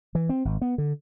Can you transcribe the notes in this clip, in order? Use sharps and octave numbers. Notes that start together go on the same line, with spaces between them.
E3
C4
G#1
B3
D3